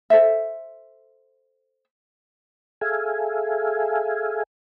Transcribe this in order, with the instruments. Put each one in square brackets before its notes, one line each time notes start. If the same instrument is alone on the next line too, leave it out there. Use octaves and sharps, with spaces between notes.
[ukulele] A4 C5 E5
[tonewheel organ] G#4 A4 E5 F5 G#5